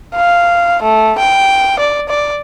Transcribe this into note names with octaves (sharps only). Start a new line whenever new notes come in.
F5
A3
G5
D5
D5